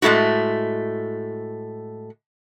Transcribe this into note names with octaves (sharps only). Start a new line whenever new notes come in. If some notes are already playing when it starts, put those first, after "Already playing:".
A2 G#3 A3 E4 F#4